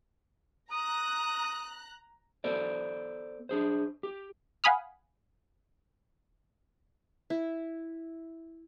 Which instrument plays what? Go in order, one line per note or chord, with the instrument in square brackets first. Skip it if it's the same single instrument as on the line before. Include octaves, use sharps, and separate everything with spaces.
[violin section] A#5 F#6 [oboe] D#6
[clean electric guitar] B3 A4 C5 D5
D4 G#4 C5
G4
[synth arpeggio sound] F5 F#5 G#5 B5 D#6 F6
[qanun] E4